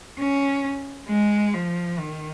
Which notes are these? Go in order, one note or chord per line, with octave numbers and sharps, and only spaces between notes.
C#4
G#3
F3
D#3